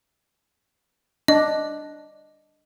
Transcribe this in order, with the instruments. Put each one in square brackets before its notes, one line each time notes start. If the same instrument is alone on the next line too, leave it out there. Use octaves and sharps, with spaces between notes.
[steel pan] D4 [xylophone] D#5